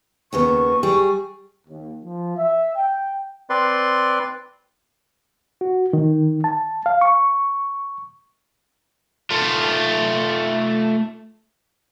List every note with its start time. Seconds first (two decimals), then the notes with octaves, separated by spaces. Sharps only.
0.33 D#2 C#3 B3 C#6
0.83 G3 G#4
1.67 D#2
2.04 F3
2.37 E5
2.76 G5
3.50 C4 B4 D5 C6
5.61 F#4
5.93 D#3
6.44 A5
6.86 F5
7.01 C#6
9.30 A3 F4